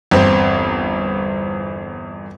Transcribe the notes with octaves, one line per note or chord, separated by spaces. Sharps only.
G1 E2 C4